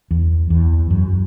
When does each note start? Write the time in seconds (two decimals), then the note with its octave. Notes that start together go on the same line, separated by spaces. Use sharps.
0.11 E2
0.50 E2
0.90 F#2